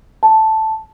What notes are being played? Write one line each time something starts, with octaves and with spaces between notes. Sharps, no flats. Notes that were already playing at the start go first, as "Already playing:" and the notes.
A5